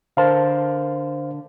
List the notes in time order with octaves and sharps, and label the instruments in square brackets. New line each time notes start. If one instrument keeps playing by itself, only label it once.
[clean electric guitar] D3 A#4 A5 [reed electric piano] C5 F5